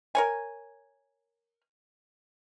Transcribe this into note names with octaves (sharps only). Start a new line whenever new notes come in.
A#4 C#5 G#5